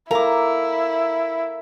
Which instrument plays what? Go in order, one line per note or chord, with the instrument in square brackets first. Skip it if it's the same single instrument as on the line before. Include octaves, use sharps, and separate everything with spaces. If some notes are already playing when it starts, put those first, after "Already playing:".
[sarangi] E4 [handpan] A4 A#4 F5 [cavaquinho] A#5 D6